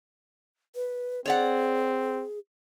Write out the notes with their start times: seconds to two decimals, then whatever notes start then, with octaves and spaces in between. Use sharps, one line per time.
0.75 B4
1.26 C4 G#4 C#5 D5 F#5